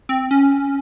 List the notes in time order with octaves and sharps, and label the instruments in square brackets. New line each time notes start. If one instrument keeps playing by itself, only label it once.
[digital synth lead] C4
C#4